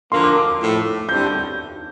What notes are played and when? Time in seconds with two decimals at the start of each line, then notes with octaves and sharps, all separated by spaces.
0.12 D3 F3 A#3 C6
0.24 D6
0.36 D6
0.61 A2 F3 A3
1.09 D3 G3 C4 E4 A4 G6
1.27 G6